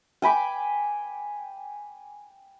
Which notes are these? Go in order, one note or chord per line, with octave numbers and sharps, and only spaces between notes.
G5 G#5 B5 D6